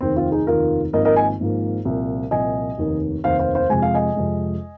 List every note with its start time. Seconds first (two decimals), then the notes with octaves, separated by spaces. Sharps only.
0.01 F1 D#2 D#3 C4
0.16 C4 F4
0.32 D#4 G#4
0.47 F1 D#2 D#3 F4 A#4
0.93 G#1 G#2 F3 A#3 A#4 D#5
1.05 A#4 D#5
1.16 D#5 G#5
1.39 G#1 G#2 F3 A#3
1.85 C2 A#2 F3
2.31 C2 A#2 F3 D#5 G#5
2.78 F1 D#2 D#3
3.24 F1 D#2 D#3 C5 F5
3.39 C5 F5
3.55 C5 F5
3.70 F2 C3 G#3 G#5
3.82 F5
3.94 D#5 G#5
4.16 F2 C3 G#3